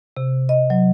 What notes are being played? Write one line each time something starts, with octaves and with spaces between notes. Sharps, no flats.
C3
D#5
F#3